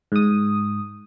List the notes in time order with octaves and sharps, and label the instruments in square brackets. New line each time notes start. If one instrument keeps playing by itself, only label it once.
[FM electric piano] G#2 D#6